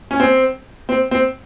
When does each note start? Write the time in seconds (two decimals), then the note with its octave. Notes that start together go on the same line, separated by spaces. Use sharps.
0.11 C#4
0.20 C4
0.89 C4
1.11 C4